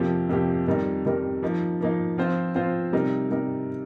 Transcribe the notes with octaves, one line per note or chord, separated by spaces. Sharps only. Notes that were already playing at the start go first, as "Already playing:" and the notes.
Already playing: F2 C3 F3 A#3 G4
F2 C3 F3 A#3 G4
F2 D#3 G3 D#4 A#4
F2 D#3 G3 D#4 A#4
F3 A#3 D#4
F3 A#3 D#4
F3 C4 F4 C5
F3 C4 F4 C5
C3 G3 D#4 A#4
C3 G3 D#4 A#4